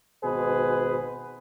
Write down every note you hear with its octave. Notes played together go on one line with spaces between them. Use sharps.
G#1 B2 G#4 B4 C5